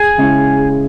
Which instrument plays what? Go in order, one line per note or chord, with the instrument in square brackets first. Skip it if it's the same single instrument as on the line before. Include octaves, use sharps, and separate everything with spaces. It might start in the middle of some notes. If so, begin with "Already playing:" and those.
Already playing: [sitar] G#4
[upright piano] C#3 G#3 C#4 E4